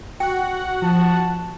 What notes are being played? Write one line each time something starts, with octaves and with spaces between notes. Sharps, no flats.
F#4 F#5 G5
F3 A5